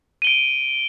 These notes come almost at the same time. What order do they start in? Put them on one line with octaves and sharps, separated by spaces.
D#7 G7 D7